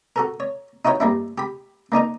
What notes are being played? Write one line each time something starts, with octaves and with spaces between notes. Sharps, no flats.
F#4 A4 A#4
C#5
D#4 E4 F#4 C5 C#5
G2 A#3 D4 E4
G4 B5
A#3 D4 D#4 A#4